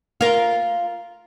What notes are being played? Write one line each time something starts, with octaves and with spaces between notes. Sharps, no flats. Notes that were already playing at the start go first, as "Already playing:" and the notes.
F4 A#4